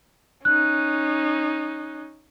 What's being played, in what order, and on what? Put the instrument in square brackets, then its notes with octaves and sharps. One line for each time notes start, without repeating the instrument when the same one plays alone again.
[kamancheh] C#4 D#4 [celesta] F#6